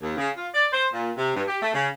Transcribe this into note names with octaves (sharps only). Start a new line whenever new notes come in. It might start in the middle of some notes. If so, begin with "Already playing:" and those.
D#2
C#3
F4
D5
C5
A#2
C3
G2
G4
A3
C#3